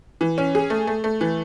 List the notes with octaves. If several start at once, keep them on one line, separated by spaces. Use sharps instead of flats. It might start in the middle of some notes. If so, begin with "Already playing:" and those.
E3
C#4
G#4
A3
A3
A3
E3